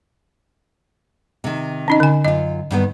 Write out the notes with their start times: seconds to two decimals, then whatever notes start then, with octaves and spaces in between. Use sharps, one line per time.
1.44 C3 D#3
1.88 C#4 D#4 D#5
2.00 D3 G#5
2.25 F#2 F4 D#5
2.71 G2 D#3 B3